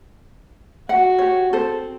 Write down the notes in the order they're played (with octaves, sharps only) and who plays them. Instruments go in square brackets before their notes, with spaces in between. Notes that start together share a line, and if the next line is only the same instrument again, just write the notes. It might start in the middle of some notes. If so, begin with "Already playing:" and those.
[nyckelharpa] F#4 [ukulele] F#5
[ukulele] G4 C#5
[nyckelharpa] C4 [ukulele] A4 C5